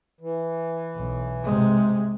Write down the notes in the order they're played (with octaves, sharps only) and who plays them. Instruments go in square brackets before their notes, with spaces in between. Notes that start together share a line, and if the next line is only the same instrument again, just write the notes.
[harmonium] E3
[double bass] B1
C3 G#3